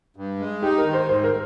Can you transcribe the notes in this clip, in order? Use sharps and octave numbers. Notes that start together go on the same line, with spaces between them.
G2
G#3
D#4 G4
A#4
D#3
C5
G#2 C5
A#4